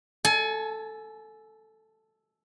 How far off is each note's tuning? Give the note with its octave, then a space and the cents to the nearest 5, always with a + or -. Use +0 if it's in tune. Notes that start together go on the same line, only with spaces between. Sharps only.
A4 +0 G#5 +30